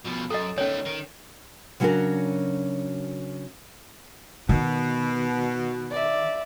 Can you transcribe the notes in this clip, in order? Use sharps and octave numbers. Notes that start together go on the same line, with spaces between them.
B2 F3
F#2 A4 D#5
D#3 A3 C#4 C#5
D#3
C#3 F#3 C#4 D4 F#4 A#4
B2 D#3
D5 E5